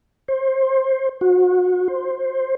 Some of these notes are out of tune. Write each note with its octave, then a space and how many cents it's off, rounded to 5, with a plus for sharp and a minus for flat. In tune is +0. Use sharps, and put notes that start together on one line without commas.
C5 +25
F#4 -30
C5 +10